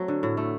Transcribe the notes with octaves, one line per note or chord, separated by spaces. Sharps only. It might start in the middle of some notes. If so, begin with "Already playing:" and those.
Already playing: F#3 A3 C4
D3
A2
A3